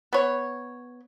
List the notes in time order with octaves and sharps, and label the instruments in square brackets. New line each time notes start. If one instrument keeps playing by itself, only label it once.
[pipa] B3 C#5